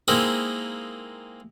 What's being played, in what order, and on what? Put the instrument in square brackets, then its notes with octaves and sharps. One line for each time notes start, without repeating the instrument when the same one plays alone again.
[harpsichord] G#3 A#3 C4 D#4 E4